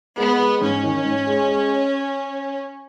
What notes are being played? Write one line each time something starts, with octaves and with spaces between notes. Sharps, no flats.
G#3 B3
G#3
G#2 C#4
D#3
G#2
G#3
G#3